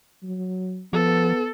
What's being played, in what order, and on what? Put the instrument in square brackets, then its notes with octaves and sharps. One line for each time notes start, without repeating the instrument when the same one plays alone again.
[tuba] F#3
[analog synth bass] F3 [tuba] B3 [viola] A4